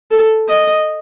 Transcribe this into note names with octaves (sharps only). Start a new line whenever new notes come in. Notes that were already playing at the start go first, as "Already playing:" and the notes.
A4
D#5